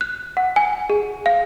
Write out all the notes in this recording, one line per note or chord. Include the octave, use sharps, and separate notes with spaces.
F#6
F#5
G#5
G#4
F5